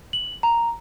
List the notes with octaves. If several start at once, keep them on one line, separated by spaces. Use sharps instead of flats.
F#7
A#5